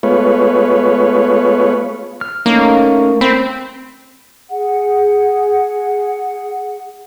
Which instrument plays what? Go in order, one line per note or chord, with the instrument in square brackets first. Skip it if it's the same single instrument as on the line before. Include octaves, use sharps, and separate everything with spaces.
[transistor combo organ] G#3 A3 B3 F4 B4 C#5
[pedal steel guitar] F6
[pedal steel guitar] A3 C#4 D#4 [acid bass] A#3
[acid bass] C4 [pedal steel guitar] B5
[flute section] G#4 F#5